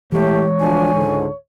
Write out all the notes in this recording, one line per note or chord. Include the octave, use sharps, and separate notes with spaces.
A2 E3 G#3 A3 G4 C#5
D2 F3 D4 G#5
C#2 G#2 D3